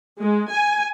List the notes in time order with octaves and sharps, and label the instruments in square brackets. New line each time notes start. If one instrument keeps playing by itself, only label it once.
[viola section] G#3
G#5